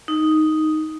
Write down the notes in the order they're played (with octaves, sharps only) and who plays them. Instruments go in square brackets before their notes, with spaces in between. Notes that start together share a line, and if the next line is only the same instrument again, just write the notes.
[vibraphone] D#4